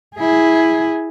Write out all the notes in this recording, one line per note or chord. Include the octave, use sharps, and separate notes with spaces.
E4 G#4